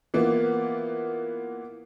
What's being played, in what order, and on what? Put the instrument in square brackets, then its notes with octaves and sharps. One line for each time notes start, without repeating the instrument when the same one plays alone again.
[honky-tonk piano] E3 A#3 B3 F4